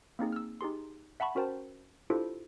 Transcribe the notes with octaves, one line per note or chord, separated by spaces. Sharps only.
A#3 C4 D#4 G#4
E6 F6
D#4 G4 G#4 C6
E5 F#5 A5 B5 C#6
C#4 F#4 A#4 C5 G5 A5
D4 E4 F4 G4 A4 C5